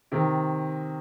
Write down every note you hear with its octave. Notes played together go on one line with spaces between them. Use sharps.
C3 D#3